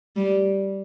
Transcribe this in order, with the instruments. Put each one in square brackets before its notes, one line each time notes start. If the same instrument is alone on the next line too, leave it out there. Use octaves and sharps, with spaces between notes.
[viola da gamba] G3